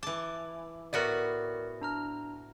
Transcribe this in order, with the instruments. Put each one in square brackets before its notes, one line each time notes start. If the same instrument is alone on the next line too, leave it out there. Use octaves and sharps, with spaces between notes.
[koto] E3 A5 [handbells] D6
[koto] A2 B3 F#4 [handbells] A#4 D5
[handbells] D4 A#5 F6